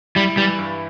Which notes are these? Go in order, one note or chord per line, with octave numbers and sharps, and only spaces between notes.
G3 E4
E3 G3
G2